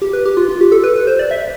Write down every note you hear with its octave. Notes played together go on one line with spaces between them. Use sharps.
G4
B4
G4
F4
F4
G4
A4
B4
B4
C5
D5
E5